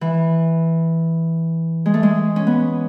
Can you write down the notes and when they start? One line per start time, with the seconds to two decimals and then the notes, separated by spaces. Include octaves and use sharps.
0.01 E3
1.86 G#3
1.94 A3
2.03 G#3
2.36 C#4
2.47 B3